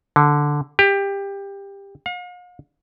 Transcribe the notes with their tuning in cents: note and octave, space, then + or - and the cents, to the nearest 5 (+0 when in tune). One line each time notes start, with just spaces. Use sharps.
D3 +0
G4 +20
F5 +45